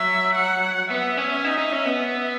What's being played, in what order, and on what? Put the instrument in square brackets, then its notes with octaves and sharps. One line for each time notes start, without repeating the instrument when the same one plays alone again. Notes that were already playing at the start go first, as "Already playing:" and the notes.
Already playing: [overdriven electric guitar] F#3 [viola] E5
[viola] F#5
[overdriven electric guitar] B3 [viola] E5
[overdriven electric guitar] C#4
D#4
D#4
C#4
B3
[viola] E5